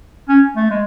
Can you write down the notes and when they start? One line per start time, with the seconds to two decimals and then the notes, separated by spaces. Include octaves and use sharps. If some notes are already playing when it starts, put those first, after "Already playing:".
0.29 C#4
0.56 A3
0.70 G#3